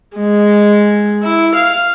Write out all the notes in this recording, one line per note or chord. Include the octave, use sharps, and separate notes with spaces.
G#3
E4
F5